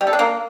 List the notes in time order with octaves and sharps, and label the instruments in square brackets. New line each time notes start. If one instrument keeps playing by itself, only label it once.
[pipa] G3
A4
D4
A#3